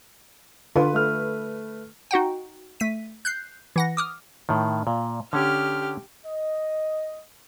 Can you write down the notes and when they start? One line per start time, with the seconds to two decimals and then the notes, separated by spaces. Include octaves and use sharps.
0.76 D3 F4 B4
0.94 A3 F6
2.11 D#4 F#4 F#5 G5
2.80 A3 B6 D#7
3.25 F#6 G6 C7
3.76 E3 F#5 A#6
3.97 D6 D#6 F6
4.49 A2 D#3
4.87 A#2
5.33 D3 C#4 G4 F6
6.26 D#5